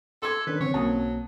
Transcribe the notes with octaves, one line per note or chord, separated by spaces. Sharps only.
A4 C6 D6 G#6
D#3 C#4 D4 B4
D3 F3 C4 C#4 C#5
B1 F#3 A#3 A5 D#6